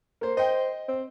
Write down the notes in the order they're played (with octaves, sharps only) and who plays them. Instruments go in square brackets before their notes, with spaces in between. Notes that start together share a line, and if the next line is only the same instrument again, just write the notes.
[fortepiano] A#3 C5
[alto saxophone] C5 [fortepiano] D#5 G5
[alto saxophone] C4